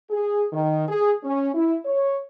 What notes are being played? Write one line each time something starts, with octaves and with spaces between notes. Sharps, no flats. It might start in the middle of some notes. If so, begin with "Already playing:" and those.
G#4
D#3
G#4
C#4
E4
C#5